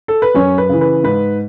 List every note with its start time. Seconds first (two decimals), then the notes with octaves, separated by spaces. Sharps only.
0.08 A4
0.22 B4
0.35 F#2 C#4 C#5
0.58 B4
0.69 C#3 E3
0.81 B4
1.04 G#2 B4